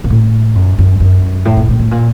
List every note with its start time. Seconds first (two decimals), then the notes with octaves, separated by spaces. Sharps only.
0.04 A#2
0.10 A2
0.55 F#2
0.78 F#2
1.00 F#2
1.45 A2
1.57 A#2
1.69 A2
1.79 A2
1.91 A#2